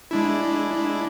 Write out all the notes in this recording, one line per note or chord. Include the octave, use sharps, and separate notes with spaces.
G#3 D4 E4